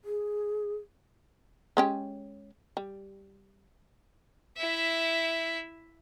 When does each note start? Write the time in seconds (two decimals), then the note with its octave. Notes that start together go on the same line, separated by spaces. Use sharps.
0.05 G#4
1.77 G#3 C#4 G4
2.77 G3
4.57 E4 E5